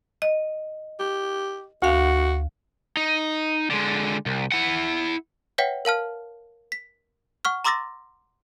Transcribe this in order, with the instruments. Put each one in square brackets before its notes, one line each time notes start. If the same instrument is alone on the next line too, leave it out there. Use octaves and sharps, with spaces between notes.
[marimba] D#5
[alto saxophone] G4
[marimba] D2 F5 [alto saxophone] F#4
[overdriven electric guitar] D#4
D3 G#3
C2
E4 F#5
[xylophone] B4 C#5 E5 F#5 G5 B6
A#4 F5 A5 F6
B6
F#5 C#6 F6
A#5 C6 D6 E6 A6 A#6